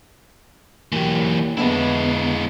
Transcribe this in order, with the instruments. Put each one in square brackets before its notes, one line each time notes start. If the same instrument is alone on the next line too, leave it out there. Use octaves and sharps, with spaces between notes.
[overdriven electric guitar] E3 F#3 [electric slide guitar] A#3 G4
[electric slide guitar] D3 B3 [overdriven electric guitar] G#3 E4